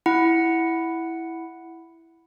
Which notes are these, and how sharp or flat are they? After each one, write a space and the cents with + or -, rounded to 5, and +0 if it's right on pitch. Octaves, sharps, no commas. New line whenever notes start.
E4 +0 F#5 +0